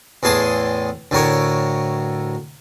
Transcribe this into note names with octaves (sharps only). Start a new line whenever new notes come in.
E2 A2 G#4 A5 C6 D#6
D2 A2 A#4 C#5